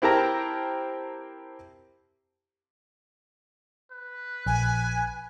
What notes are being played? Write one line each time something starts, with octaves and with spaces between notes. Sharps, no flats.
C4 E4 G4 A#4 A5 A#5
B4
A#1 G#5